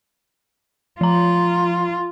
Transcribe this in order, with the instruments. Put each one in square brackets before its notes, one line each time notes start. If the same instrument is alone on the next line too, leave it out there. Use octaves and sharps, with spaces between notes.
[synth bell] F3 A#5 [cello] F4